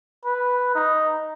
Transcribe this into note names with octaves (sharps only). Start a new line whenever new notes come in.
B4
D#4